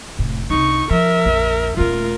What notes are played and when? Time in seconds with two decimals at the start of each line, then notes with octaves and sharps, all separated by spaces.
0.19 F1 A2
0.50 C2 D4 D#4 C#6
0.91 F3 A#4 E5
1.26 A#1 F2
1.77 D#1 A3 F4 A#4